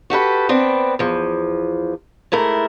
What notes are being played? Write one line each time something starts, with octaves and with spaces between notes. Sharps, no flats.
F#4 G4 A4 B4
B3 C4 D4 B4
E2 F3
G#2 A3 E4 A#4